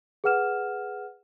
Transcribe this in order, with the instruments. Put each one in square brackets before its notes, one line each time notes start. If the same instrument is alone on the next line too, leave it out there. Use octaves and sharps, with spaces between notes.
[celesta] G#4 B4 F#5 F6 E7